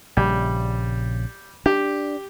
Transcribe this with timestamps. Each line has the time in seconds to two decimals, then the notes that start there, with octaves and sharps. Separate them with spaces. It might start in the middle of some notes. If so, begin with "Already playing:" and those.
0.17 A#1 C#3 G3
1.66 D4 G4